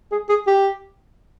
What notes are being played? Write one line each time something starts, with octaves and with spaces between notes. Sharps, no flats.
G#4
G#4
G4